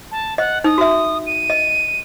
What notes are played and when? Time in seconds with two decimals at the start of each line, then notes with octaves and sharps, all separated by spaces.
0.12 A5
0.38 D#5 F#5
0.64 D#4 D#6
0.78 F#4 E5
1.27 D#7
1.50 D#5